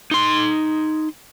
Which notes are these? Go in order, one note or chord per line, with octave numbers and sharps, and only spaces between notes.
D#4 C6